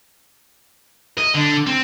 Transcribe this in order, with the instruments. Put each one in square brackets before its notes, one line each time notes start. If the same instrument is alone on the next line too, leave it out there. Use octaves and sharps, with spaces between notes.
[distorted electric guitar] D#5
D3
C4